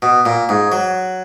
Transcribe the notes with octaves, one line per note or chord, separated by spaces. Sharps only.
B2
A#2
G#2
F#3